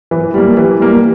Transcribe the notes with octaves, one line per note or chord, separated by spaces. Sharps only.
E3
G3 A#3
E3
G3 A#3